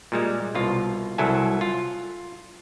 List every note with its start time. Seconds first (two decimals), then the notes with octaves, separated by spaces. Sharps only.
0.12 A#2 G3 G#3
0.55 C2 B2 F4
1.18 C2 F#3 E4 A4 G#5
1.61 F4